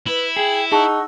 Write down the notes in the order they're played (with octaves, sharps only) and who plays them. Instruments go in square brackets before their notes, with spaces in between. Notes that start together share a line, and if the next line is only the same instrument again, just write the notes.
[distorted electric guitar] E4 [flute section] B4
[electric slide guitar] G#4 [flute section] G5
[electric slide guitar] D#4 [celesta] G#4 A5 [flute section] F#5 C#6 E6